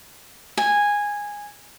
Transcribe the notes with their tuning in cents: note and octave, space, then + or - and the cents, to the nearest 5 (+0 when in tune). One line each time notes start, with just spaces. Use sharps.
G#5 -10